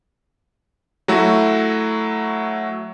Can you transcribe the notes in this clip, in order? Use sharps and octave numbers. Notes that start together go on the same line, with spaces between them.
F#3 A3 E4 F#4